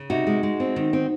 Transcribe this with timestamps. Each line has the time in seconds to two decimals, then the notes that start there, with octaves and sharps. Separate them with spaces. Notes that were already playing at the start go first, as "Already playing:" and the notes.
Already playing: C#3
0.10 C3 D#4 F#4
0.27 G#3
0.43 G#3
0.60 C4
0.76 D#3
0.93 C4